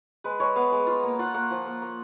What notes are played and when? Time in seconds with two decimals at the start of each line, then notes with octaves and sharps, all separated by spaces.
0.24 G#3 B4
0.40 G#3 C#5
0.56 B3 F5
0.72 G#3
0.87 F4
1.03 A#3
1.19 F4 F#5
1.34 A#3 F#5
1.50 F3
1.66 A#3
1.82 A#3